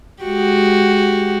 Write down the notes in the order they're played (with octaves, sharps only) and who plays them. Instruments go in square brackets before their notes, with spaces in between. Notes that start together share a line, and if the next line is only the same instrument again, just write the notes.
[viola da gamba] G#3 F#4 G4